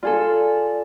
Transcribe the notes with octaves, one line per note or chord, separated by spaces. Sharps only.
F4 G#4 A4 D5